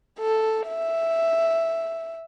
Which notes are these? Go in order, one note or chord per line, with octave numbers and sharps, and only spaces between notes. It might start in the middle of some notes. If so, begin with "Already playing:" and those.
A4
E5